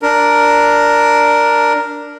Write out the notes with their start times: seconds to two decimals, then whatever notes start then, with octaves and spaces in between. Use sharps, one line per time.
0.02 D4 A#4